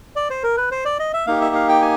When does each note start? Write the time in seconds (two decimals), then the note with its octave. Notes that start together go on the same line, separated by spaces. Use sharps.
0.16 D5
0.30 C5
0.43 A#4
0.57 B4
0.72 C5
0.85 D5
0.99 D#5
1.13 E5
1.27 A#3 D#4 G4 F5
1.41 E5
1.55 F5
1.69 G5
1.82 G#5